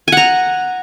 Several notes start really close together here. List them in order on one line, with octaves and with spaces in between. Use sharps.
G#5 F#5 A#5